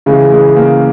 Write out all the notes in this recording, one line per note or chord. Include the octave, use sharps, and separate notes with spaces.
C#3 E3 G#3
G#3
A#3